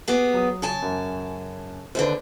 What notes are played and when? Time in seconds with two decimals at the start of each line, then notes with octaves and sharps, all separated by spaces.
0.08 B3 G4 G#4
0.33 F#3 D#6
0.62 C#3 G#5 A5
0.82 F#2
1.95 D#2 G#2 D3 B4 C5